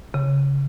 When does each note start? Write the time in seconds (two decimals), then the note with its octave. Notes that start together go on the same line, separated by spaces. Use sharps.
0.14 C#3